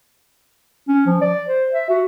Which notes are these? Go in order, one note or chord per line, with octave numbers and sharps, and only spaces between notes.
C#4
F3
D5
C5
E5
F#4